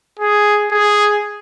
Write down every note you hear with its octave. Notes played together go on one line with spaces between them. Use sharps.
G#4
G#4